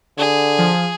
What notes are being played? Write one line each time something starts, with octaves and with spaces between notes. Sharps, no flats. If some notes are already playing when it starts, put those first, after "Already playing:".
D3 G#4
F3